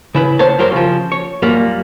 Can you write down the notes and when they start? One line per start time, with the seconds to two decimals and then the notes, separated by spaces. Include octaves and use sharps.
0.15 C#3 E4 B4
0.39 C#2 C5 C#5 A5
0.58 F#2 F#3 G3 A#4 C5
0.72 C#3 F3
1.12 C#5
1.42 F#2 A#2 G3 A#3